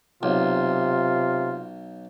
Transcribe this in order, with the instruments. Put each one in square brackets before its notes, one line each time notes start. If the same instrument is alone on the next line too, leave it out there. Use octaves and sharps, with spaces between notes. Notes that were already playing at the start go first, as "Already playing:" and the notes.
[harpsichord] B1 [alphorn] C3 [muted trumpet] F4